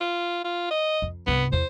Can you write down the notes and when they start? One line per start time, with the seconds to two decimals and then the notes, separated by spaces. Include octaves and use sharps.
0.01 F4
0.44 F4
0.70 D#5
1.02 F2
1.27 C2 G2 B3
1.52 E2 C5